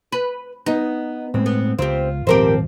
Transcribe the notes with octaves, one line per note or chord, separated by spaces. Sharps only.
B4
B3 D#4
A2 G#3 C4
B3
C#2 C4 F4 G4
D#1 G#1 F3 C4 G4 A#4 C5